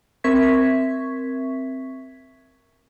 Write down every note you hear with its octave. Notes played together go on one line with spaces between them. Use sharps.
C4 A#4 E5 C#6 G#6 B6